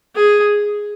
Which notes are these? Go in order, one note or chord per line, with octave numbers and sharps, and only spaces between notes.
G#4